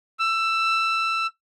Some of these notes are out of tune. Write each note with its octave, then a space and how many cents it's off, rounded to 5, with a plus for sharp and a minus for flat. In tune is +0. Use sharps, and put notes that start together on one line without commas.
E6 +15